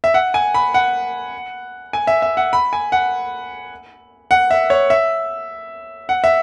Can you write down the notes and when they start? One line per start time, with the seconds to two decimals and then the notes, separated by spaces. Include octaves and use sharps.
0.04 E5
0.14 F#5
0.34 G#5
0.54 B5
0.74 F#5
1.93 G#5
2.07 E5
2.22 E5
2.37 F#5
2.53 B5
2.73 G#5
2.92 F#5
4.31 F#5
4.51 E5
4.70 C#5
4.90 E5
6.09 F#5
6.24 E5